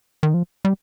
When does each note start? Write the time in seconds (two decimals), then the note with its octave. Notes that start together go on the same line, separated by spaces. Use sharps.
0.23 D#3
0.34 F3
0.65 G3